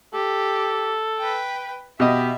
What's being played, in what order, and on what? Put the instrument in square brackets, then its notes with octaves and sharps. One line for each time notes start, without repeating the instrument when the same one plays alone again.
[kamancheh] G4 [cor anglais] A4
[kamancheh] B4 G5
[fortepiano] B2 D#5 [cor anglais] G4 [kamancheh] E5